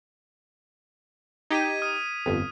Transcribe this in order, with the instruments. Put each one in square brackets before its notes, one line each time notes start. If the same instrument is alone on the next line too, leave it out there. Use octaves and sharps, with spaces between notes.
[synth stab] D#4 G4 [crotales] G#6 B6 D#7
[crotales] D#6 F6 D#7
[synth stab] G1 F2